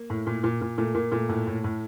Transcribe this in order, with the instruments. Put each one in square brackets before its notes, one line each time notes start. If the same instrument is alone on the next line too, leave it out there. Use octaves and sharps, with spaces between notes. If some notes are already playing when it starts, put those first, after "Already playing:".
Already playing: [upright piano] A#3
A2
A#2
A#2
A#2
A#2 A3
A#2 A#3
A#2 A3
A2 A3
A2
A2